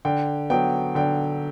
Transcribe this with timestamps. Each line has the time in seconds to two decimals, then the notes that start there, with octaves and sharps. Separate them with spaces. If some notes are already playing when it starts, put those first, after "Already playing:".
0.05 D3 G5
0.50 F#3 B3 G5
0.95 D3 G5